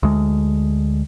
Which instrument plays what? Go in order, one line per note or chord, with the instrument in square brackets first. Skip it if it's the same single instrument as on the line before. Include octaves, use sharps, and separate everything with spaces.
[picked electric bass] D2 G#3